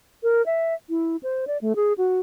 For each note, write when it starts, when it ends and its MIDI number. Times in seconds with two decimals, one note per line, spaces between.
0.23 0.44 70
0.46 0.74 76
0.89 1.16 64
1.23 1.45 72
1.47 1.57 74
1.61 1.75 57
1.76 1.93 68
1.98 2.20 66